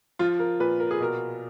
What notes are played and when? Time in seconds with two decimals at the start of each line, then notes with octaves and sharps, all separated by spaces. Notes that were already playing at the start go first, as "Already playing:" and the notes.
0.19 F3 F4
0.39 A#4
0.60 A#2 B4
0.80 A#4
0.91 G#4
1.00 B2 A#4